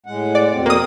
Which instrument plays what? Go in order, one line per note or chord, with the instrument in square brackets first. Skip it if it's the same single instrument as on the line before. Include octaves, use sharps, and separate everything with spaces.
[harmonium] A2 G#3 F#5
[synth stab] D5
[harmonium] F2 B2 C4
[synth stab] A#3 D#6